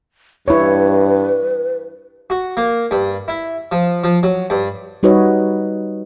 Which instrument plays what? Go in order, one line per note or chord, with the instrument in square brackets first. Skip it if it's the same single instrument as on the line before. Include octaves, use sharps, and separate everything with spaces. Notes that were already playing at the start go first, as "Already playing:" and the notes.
[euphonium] G2 [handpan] E4 C#5 [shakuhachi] B4
[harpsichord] F#4
A#3
G2
E4
F3
F3
F#3
G2
[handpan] G3 D#4 F#4 B4 C#5 D#5